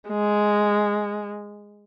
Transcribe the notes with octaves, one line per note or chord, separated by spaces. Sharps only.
G#3